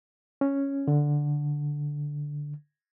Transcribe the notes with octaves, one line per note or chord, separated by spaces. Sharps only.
C#4
D3